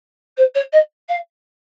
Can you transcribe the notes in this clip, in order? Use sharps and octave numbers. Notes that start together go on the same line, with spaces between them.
C5
C#5
D#5
F5